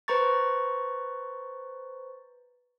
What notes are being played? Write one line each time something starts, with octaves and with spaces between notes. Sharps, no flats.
B4 C5 A#5 C#6 A6